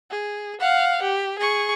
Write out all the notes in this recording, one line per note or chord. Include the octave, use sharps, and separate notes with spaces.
G#4
F5 F#5
G4
G#4 C#6